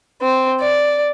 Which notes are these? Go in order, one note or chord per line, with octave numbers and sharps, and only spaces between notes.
C4
D5